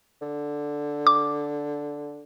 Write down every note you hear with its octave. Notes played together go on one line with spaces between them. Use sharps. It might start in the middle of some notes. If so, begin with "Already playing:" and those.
D3
D6